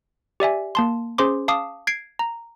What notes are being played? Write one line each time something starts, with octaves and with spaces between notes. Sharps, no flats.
G4 D5 E5 G#5
A#3 A5 C6
C#4 G#4 C5 C6 D6
F5 A5 D6 D#6
G#6 C7 D7
A#5